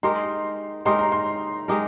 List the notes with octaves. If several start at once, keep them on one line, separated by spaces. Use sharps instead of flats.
G#3 D#4 G4 A#4 C6
G#3 D#4 G4 A#4 C6
A#5
C6
G#3 D#4 G4 A#4